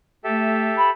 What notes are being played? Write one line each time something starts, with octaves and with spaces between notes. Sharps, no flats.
A3 G4 A4 E5
B5